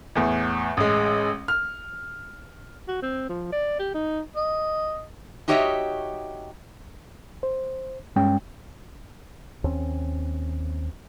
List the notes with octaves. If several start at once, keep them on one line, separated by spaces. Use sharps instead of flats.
E2 A2
A1 G#3
F6
F#4
C4
F3
D5
G4
D#4
D#5
D#4 F#4 G4 C#5 D#5 E5
C5
G2 G#3 C#4 G5
D#2 C4 C#4